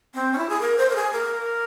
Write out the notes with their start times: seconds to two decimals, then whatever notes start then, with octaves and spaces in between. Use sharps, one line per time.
0.14 C4
0.33 C#4
0.38 E4
0.49 G#4
0.61 A#4
0.78 C5
0.90 A#4
0.95 G#4
1.13 A#4